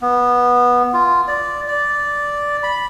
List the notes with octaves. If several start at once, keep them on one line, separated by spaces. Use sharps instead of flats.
B3
F4
D5
D5
B5